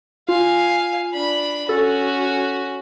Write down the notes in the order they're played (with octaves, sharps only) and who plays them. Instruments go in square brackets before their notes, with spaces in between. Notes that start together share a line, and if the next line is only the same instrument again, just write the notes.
[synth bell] F4 [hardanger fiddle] F5 G#5
[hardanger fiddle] D4 B5
[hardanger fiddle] C#4 F#4 [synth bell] A4